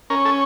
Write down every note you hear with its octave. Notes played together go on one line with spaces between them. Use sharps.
C#4 A#4
A4